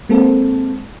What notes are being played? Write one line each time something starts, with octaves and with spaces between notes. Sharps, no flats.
G#3 A#3 C4 A4